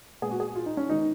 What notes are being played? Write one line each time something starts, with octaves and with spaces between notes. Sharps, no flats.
A#2 G#3 B3 G#4
F#4
G#4
F4
D#4
C#4
D#3 G#3 B3 D#4